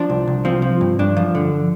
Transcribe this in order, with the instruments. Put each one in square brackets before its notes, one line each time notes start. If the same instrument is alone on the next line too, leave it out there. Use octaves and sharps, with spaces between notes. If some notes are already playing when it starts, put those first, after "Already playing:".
Already playing: [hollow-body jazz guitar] F3 D4
C2
C2
F3 C4
F3
G2
G2 D4
F3
D3